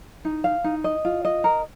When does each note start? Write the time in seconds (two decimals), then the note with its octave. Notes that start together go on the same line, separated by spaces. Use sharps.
0.25 D#4
0.44 F5
0.64 D#4
0.84 D#5
1.05 F4
1.25 D#5
1.44 A#4